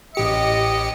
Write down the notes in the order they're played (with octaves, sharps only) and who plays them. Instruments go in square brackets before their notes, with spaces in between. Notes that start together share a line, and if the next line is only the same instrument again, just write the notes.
[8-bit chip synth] A1 G4 C#7 [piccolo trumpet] D#5